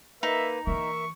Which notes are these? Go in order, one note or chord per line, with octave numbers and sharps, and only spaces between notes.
A#3 D#4 B4 E5
E3 A#3 A#4 E5 C#6